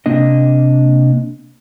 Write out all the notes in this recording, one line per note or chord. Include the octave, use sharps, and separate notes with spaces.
C3 A#3 D4 D#5